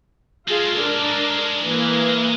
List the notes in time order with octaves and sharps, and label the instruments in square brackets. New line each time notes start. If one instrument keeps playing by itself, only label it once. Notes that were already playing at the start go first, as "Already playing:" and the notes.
[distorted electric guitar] G#3 A4 [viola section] F4 G#4
[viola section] D4 A#4
E3 A#3